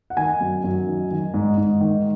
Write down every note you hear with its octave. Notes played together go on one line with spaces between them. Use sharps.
F#5
D#3 G#5
F#2
F#2
D#3
D#3
G#2
G#2
D#3